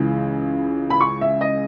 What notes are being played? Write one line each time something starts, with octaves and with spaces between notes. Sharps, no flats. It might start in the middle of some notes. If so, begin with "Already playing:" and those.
Already playing: C#2 C#3 E3
B5
C#6
E5
D#5